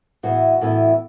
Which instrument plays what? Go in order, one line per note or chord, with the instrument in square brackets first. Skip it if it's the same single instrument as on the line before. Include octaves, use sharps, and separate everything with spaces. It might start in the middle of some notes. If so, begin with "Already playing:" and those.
[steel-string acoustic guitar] A2 E3 B3 E4 F#4
A2 E3 B3 E4